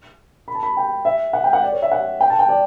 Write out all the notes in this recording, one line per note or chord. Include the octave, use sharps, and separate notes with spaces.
B5
A5
B5
G5
E5
F#5
G5
F#5
D5
C#5
E5
F#5
G5
A5
G5
D5